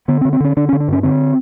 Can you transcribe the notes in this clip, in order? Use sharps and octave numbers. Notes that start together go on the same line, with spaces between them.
D3 B3
C4
D3
C4
D3 C#4
D3 D4
C#4
D3
D4
G2 C#4
D3 C4